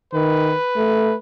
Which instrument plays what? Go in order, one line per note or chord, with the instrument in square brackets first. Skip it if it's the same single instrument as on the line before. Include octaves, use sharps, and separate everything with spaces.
[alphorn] D#3 [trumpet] B4
[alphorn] A3